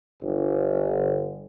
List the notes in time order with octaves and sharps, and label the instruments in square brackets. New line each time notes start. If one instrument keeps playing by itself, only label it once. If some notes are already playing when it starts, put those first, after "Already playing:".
[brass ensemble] G1